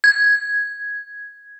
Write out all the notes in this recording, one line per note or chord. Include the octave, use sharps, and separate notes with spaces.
G#6